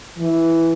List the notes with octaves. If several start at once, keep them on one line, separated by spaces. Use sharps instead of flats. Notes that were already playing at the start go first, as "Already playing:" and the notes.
E3